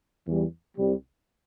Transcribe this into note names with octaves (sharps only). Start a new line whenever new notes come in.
E2 E3 G3
C2 C3 G3